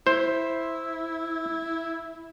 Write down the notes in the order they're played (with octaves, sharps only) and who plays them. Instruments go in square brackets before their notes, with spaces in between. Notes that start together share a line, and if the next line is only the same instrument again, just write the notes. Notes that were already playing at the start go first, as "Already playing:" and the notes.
[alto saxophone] E4 [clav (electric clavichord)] C5